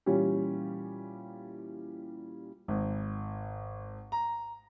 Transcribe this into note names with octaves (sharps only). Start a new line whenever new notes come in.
A#2 E3 G3 C#4 F4 G4
G#1
A#5